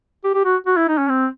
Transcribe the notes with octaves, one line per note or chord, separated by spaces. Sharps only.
G4
G4
F#4
F#4
E4
D#4
C#4
C4